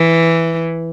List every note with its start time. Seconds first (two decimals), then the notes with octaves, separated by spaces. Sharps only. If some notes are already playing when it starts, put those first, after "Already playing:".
Already playing: E3